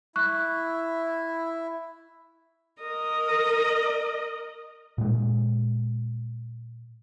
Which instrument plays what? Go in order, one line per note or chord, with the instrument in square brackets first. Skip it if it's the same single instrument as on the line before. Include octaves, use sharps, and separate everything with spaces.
[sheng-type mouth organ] E4 [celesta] C#6 F#6
[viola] A#4 D#5
[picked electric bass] A#2 G#3